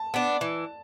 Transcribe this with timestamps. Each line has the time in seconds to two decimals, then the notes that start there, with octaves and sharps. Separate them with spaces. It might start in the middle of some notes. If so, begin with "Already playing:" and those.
Already playing: A5
0.14 B3 D4
0.41 E3